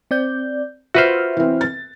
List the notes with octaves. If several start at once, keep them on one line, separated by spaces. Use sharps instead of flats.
C4 D5 G6
F4 F#4 B4 C5 E5 F6
E3 C4
A6